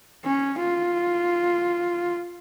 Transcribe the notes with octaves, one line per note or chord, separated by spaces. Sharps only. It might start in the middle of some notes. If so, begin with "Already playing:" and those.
C#4
F4